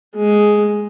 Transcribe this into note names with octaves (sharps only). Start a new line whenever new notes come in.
G#3